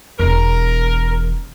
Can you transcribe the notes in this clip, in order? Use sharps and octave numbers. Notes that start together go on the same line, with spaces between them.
E1 E2 A#4